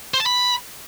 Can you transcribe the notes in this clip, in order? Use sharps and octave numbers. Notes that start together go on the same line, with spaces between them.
C5
A5
B5